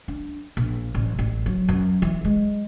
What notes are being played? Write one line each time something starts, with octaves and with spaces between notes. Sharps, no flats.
D4
A#1
A1
A1
F#3
F#2
E3
G#3